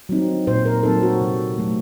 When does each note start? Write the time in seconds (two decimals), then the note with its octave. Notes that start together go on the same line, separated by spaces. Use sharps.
0.09 F#3 C4 D#4
0.47 A#2 C5
0.65 A#4
0.83 F#3 C4 D#4 A4
1.03 F#4
1.21 C3
1.58 F#3 A3